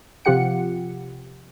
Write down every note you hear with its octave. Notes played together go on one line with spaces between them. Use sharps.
C3 F3 F4 G4 F#5 C#7